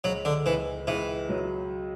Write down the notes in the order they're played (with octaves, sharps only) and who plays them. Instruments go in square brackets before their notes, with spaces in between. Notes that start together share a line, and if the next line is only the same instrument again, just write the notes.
[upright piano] C#2 [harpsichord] F#3
[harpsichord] D3
[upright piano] C#2 [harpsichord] E3
[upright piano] C#2 [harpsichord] E3
[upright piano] F#3